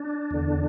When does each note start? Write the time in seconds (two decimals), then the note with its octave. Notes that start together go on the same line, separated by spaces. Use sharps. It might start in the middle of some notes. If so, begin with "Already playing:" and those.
Already playing: D4
0.31 E2 D3